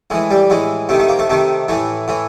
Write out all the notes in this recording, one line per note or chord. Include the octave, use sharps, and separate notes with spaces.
A2 E3 G#3
G3
A2 E3 G#3
C3 D#3 A3
A3
A#3
A3
C3 D#3 A3
A2 E3 A3
A2 E3